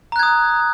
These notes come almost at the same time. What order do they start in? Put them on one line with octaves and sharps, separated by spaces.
A#5 F#6 G#6 D#6